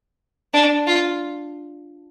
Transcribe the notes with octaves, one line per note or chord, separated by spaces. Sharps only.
D4
F4